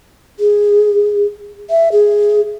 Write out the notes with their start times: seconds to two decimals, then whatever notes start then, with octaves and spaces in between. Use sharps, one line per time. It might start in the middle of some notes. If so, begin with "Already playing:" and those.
0.40 G#4
1.70 E5
1.92 G#4